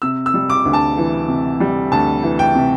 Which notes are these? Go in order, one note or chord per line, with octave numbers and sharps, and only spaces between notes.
C3 E6
E6
G3
D6
D2
A5
E3
C3
G3
D2 A5
E3
G5
C3